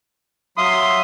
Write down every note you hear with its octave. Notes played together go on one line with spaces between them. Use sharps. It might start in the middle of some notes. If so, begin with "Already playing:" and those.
F#3 E5 F5 C6 D#6